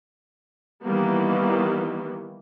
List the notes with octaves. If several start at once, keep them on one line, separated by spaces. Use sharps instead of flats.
D#3 E3 G3 A#3 B3